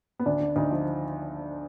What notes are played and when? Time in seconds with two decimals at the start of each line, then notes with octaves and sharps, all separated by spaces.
0.19 B3
0.26 D2 D4
0.40 D3
0.56 D2 D#4
0.71 F3